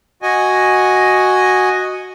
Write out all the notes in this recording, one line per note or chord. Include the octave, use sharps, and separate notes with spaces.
F#4 D#5 G#5